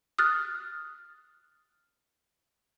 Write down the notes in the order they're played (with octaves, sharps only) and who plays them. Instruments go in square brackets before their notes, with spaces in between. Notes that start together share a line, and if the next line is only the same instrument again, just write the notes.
[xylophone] D#6 F6 F#6 A6